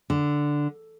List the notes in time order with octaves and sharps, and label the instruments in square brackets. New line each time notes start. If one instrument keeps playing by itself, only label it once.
[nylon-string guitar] D3